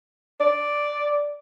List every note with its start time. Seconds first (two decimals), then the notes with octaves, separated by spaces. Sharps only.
0.40 D5